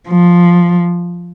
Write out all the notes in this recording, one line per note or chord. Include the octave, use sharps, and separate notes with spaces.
F3